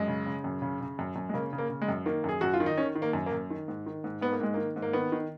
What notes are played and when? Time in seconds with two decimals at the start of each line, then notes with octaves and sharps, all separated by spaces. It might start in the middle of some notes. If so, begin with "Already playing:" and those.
Already playing: F#2 G#3
0.08 C#3
0.26 C#3
0.44 F#2
0.62 C#3
0.81 C#3
0.99 F#2
1.16 F#2
1.29 G#3
1.34 C#3 A#3
1.53 C#3
1.58 A#3
1.70 C#3
1.82 G#3
1.89 F#2
2.06 D#3 A#3
2.24 F#2 G#4
2.41 F#2 F#4
2.54 F4
2.60 D#3
2.66 D#4
2.77 D#3 C#4
2.95 D#3
3.02 A#3
3.13 F#2
3.26 A#3
3.32 F#2
3.51 D#3
3.68 G#2
3.86 D#3
4.04 G#2
4.21 G#2 B3
4.32 A#3
4.40 G#2 G#3
4.54 D#3 A#3
4.76 G#2
4.82 A#3
4.93 D#3 B3
5.12 D#3